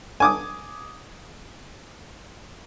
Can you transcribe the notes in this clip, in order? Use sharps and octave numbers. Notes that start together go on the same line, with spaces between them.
G#5 D6 D#6